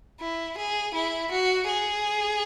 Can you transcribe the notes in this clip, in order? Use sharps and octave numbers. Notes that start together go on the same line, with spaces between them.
E4
G#4
E4
F#4
G#4